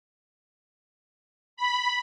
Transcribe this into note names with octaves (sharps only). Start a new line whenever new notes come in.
B5